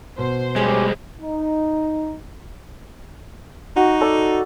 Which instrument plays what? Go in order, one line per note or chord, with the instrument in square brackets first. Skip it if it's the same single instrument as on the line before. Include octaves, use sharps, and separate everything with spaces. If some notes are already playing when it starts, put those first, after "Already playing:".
[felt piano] B2 [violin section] C5
[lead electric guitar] G3 G#3 [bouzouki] C#4 G4
[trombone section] D#4
[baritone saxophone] D#4 [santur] F#4
[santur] A4 D5 C#6